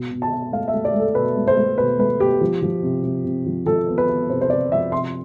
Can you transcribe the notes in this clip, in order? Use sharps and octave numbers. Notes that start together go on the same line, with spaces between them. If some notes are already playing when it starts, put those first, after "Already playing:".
Already playing: B2
B2
A5
B2
A3 F5
E5
A3
D5
A3
A4
B2 B4
A3
C5
A3
B2 B4
A3 B4
B2 G4
F3
F3
C3
C3
C3
F3
F3 A4
B3
B4
B3
C3 C5
C5
C3 D5
F3 E5
C3 C6